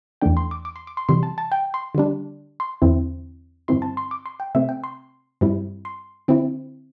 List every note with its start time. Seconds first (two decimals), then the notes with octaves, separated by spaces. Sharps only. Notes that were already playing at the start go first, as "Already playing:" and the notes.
0.22 E2 E3 A3 D4 G5
0.37 C6
0.51 D6
0.65 D6
0.76 C6
0.87 D6
0.97 C6
1.09 C3 E3 G3 C6
1.23 A5
1.38 A5
1.52 G5
1.74 C6
1.95 D3 G3 D4
2.60 C6
2.82 E2 D3 C4 E4
3.68 G2 D3 C4 E4 C6
3.82 A5
3.97 C6
4.11 D6
4.26 C6
4.40 G5
4.55 C3 A3 C4 E5
4.69 G5
4.84 C6
5.41 G2 G3 C4 E4
5.85 C6
6.28 D3 C4 E4